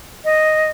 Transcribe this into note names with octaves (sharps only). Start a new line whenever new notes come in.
D#5